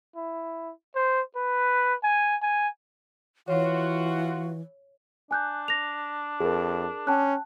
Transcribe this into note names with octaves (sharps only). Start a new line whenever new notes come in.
E4
C5
B4
G#5
G#5
E3 F4 F#4 C#5
D4 G#5 F#6 G6
A#6 F7
F2 G#4 A#4
C#4 G5 A5 F#6